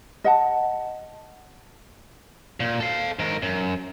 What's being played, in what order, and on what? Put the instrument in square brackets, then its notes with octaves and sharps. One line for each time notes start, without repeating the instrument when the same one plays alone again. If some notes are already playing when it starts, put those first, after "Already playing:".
[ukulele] D#5 F#5 A5
[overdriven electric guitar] A#2
A4 F5
G#2 A#4
F#2